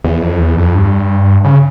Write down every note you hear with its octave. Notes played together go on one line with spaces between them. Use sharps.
E2
F2
E2
F2
G2
C#3